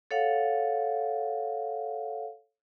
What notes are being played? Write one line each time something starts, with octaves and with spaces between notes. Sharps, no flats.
A4 C#5 F5 F#5